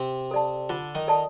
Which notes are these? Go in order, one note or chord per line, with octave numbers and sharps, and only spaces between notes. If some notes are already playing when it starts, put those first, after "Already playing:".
Already playing: C3 C4
A4 D5 A5
D3 D4 F4
D#3 D#4
A4 D5 A5